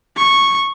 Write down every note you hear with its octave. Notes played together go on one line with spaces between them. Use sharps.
C#6